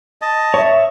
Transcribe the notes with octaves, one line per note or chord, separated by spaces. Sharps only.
D#5 A5
C#5 E5